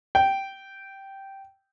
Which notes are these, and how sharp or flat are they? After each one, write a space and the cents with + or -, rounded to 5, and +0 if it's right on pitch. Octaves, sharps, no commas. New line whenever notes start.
G5 -10